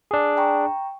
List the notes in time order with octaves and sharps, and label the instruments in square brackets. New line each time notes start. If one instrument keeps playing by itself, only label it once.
[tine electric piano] D4 G#4
[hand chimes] G5 A#5 C#6